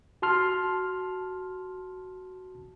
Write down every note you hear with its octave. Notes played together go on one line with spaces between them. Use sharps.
F#4 A5 C6 F6